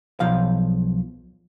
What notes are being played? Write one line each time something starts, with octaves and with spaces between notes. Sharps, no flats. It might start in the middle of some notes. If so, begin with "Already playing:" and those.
B1 F3 F5